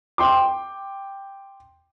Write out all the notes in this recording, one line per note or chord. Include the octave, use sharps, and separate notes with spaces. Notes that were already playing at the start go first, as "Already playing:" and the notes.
G5 C6 D6